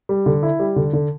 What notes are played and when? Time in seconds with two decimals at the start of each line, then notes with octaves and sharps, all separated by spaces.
0.09 G3
0.26 D3
0.43 E4
0.59 G3
0.76 D3
0.93 D3